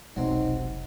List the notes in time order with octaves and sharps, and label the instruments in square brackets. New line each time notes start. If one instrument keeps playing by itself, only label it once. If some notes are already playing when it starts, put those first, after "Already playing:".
[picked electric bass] F1 C3 [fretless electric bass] B1 G#3 [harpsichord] F#3 C4 [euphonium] D#4